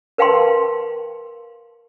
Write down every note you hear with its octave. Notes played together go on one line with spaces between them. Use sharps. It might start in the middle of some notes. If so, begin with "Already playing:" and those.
A#4 B4 F5 G5 A5 C6